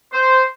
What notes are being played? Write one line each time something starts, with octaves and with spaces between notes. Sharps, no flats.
C5